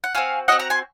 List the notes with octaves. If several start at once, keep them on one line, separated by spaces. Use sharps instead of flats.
F#5
C4 F#4 F5 G#5
C4 F#4 D#5 F#5
F#5 A#5
G#5 C6